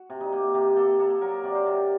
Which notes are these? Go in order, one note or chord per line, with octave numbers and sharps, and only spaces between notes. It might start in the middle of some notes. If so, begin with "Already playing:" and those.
Already playing: F#4
C3
D#4
A#3
C3 G4
A#3 A4
A#3 A4
F#3 A#4
C3 D5
C5
C3